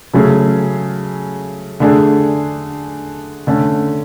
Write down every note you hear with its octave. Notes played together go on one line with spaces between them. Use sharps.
C#3 F#3 A3 C#4 G#4
D3 A3 D4 G#4
D3 A3 C#4